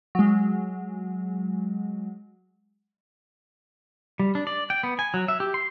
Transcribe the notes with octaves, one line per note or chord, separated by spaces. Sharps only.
F#3 G#3
G3
D4
D5
G5
B3
G#5
F#3
E5
G4
C6